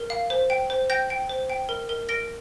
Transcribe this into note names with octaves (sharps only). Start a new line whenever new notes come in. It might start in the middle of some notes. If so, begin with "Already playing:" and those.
Already playing: A#4
F5
C5
G5
C5
G5 G6 A#6
G5
C5
G5
A#4
A#4
A#4 A#6 D7